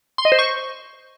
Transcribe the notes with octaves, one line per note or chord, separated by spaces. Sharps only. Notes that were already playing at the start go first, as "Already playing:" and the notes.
C6
D#5
C5
C#6